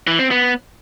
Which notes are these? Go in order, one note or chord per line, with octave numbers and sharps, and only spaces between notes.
E3
C4
B3